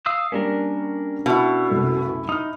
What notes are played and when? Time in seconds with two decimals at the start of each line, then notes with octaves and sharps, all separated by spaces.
0.06 F5 D#6 E6
0.32 G3 A#3 C#4 D4 A#4
1.26 B2 E4 C#6
1.70 C2 F#2 A3
2.29 D#4 D#6 F6